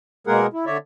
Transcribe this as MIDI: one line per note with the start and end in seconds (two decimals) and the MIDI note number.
0.27 0.47 47
0.27 0.47 56
0.27 0.47 58
0.27 0.47 68
0.27 0.47 70
0.27 0.47 78
0.53 0.65 64
0.66 0.77 50
0.66 0.77 73
0.66 0.77 74
0.66 0.77 76